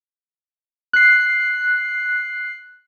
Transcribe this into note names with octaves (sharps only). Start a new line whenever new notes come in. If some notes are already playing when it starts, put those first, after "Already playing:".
F#6 C7